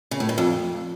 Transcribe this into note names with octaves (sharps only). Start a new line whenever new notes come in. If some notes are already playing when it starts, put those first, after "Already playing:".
C#3
A2
G2
F2